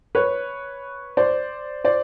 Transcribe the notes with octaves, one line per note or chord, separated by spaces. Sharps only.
B4 C#5
C5 D5
C5 D5